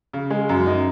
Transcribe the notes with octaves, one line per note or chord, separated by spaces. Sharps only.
C#3
G#3
F#2
D#4